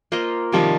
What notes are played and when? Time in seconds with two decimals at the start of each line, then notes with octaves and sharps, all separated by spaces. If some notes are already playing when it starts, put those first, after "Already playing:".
0.12 A#3 F4 C5 D#5
0.52 C3 D#3 F3 G3